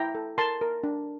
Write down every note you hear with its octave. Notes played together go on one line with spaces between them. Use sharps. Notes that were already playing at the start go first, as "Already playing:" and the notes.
Already playing: E4 G5 A#5
A4
A#4 A5 C6
A#4
D4